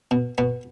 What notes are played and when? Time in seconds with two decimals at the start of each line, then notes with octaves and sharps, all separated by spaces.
0.11 B2
0.38 B2 B3